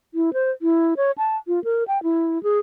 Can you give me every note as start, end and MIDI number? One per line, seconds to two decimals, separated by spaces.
0.14 0.33 64
0.33 0.51 72
0.62 0.94 64
0.97 1.11 73
1.18 1.37 81
1.48 1.63 65
1.64 1.84 70
1.88 2.01 79
2.03 2.41 64
2.43 2.59 68